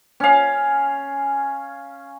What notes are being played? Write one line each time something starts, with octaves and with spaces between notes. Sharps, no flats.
C#4 F5